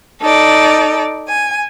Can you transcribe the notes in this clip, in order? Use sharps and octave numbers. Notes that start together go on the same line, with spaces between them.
D#4 A4 D5
G#5